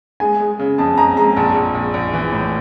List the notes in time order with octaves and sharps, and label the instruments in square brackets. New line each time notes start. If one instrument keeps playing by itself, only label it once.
[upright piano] G#3 [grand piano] G#5
[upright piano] G#3
C#3
[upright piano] F2 [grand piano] A5
[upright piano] F2 [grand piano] A#5
[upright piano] G#3 [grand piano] A#5
[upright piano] A#1 [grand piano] A5
[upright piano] A#1
A#1
A#1
E3
A2